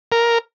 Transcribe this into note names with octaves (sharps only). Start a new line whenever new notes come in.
A#4